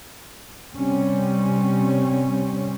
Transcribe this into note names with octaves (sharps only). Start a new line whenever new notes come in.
C3 G3 C4 C#4